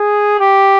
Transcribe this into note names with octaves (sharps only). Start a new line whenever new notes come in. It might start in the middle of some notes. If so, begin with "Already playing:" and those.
Already playing: G#4
G4